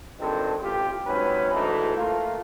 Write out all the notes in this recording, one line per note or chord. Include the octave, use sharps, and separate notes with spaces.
G#1 G2 G#3 C4 A4
A1 F4 G4
G#2 C3 F#3 C#4 B4
D2 G#2 E3 D#4 A4
A3 A#3 F4